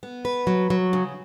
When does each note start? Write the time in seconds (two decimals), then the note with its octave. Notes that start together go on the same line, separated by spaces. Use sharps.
0.03 B3
0.25 B4
0.47 F#3
0.70 F#3
0.93 C#3